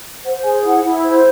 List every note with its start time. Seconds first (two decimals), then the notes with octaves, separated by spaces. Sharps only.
0.24 C5 F#5
0.44 G#4 G#5
0.63 E4 F#5
0.83 E4
1.03 C5